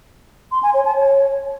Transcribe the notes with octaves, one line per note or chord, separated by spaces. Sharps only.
C6
G#5
C#5
A5
C#5